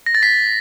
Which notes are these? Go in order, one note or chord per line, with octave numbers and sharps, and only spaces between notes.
A#6
A6
B6